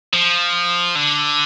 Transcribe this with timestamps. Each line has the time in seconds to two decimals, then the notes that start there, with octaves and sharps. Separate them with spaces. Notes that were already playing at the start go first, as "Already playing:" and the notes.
0.13 F3
0.96 D3